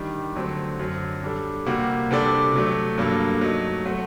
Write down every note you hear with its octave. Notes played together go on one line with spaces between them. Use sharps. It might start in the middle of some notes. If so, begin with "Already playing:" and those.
Already playing: D#3 G3 D4
D3 F#3 A3 C4
F#2 D3 F#3
G3 D4 A4
C3 G3 A#3 F#4
C3 G3 D4 A4 D5
C3 F#3 A3
G2 F#3 A#3 D4 A4
F#3 A3 D#4
F#3 A3 C4 F#4